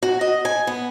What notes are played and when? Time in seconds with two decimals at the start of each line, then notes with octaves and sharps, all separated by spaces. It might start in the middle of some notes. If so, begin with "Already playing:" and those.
0.03 F#4
0.21 D#5
0.45 G#5
0.67 B3